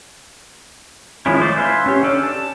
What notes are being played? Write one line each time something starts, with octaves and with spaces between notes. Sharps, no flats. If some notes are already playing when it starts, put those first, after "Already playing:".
D#3 F3 G#3 C#4 E4
A3 C5 D5
B4 E5 F5 G#5 C6
C#4 G4
C#4 D4 A4
A5